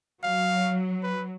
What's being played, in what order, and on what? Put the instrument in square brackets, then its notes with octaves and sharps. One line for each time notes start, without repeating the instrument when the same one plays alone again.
[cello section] F#3 [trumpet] F5
[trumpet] B4